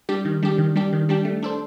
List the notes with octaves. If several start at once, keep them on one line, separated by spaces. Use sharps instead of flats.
G3 D4 G4
D#3
G3 D4 G4
D#3
G3 D4 G4
D#3
G3 D4 G4
A3
D4 A4 C5